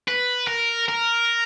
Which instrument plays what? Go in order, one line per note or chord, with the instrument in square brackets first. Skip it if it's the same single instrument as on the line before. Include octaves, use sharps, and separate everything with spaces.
[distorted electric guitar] B4
A#4
A#4